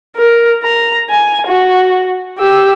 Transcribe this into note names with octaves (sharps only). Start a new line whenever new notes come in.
A#4
A#5
G#5
F#4
G4 E6